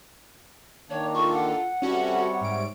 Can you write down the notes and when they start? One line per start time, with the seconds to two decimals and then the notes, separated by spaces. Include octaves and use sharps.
0.90 D#3 A#3 D4 C#5
1.14 F4 A4 C#6
1.33 F#5
1.82 C3 G3 C#4 F#4 A4 C#5
2.41 G#2 D7